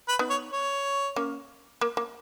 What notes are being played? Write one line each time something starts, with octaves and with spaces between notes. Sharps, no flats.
B4
B3 D#4
C#5
C#5
A#3 C#4
A#3
A#3